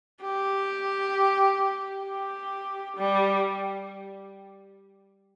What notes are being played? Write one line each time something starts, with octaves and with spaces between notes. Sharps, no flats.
G4
G4
G3